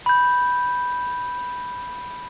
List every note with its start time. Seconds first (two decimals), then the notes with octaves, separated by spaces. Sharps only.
0.06 B5 G6